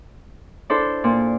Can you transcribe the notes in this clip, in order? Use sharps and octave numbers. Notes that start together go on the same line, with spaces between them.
D4 E4 A4 C5
A#2